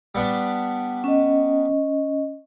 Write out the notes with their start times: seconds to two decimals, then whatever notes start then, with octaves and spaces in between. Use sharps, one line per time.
0.15 G3 B3 D4
1.04 C#4 D#5